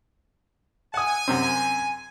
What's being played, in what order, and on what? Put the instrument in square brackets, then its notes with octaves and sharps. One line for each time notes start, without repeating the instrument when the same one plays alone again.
[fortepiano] F#5 D#6 [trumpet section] G#5
[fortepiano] F#2 C3 C4